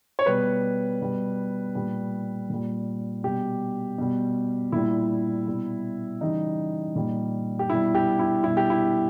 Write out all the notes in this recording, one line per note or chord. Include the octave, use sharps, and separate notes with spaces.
C#5
B2 G3 B4
B2 G3
A#2 G3
A#2 G3
B2 G3 G4
B2 G3
A#2 G3 E4
B2 G3
C#3 E3 G3 D#4
A#2 G3
G4
B2 G3 E4
G4
E4
B2 G3 E4
G4
E4